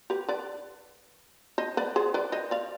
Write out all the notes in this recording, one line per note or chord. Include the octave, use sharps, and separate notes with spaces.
G4 B4
B4 D5
C5 D#5
B4 D5
G#4 C5
B4 D5
C5 D#5
D5 F5